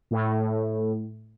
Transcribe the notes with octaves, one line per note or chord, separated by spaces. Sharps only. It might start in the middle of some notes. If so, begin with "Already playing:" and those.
A2